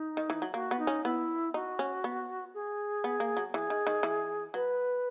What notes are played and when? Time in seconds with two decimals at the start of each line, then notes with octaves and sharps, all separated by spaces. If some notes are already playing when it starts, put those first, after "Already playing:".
Already playing: D#4
0.17 D#3
0.30 E3
0.42 F#3
0.54 A#3 F#4
0.71 B3
0.79 D#4
0.87 C#4
1.04 B3 E4
1.54 D#4 F#4
1.79 C#4
2.04 B3
2.54 G#4
3.04 B3
3.20 A#3
3.37 F#3
3.53 E3 G#4
3.70 D#3
3.87 D#3
4.03 E3
4.54 F#3 B4